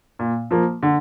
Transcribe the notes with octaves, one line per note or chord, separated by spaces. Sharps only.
A#2
F3 A#3
D3